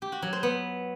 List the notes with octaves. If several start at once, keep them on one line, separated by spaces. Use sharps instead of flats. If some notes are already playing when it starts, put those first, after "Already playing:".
G4
F#4
F#3
C5
B3